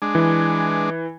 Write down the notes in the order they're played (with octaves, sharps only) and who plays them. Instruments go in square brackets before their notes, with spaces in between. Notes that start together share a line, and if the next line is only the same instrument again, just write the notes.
[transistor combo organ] G#3 D4
[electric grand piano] E3